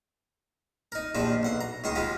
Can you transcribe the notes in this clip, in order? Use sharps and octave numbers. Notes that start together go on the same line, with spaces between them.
D#4 A#4
A#1 D#2 F3 D4 D#4
B1 F#5 C6
A#5
C#2 D#3 C6 C#6 D#6
F#3 G#3 C#4 F4 G4